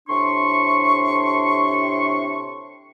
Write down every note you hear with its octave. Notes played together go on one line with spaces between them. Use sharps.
A2 C3 D4 C6 C#6